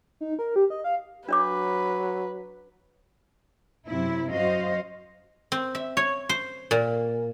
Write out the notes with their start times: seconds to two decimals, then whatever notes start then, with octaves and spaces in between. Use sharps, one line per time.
0.21 D#4
0.39 A#4
0.56 G4
0.70 D#5
0.84 F5
1.29 F#3 D4 B4 C#5 D6
3.88 F#2 C3 E4
4.33 F#2 F#4 C5 D#5 F5
5.52 C4
5.75 E5
5.97 C#5
6.29 C5
6.71 A#2